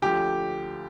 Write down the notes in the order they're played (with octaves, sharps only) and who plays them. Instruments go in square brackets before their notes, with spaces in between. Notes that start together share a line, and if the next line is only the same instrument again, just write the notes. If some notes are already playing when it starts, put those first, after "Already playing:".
[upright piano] D2 D3 F3 G4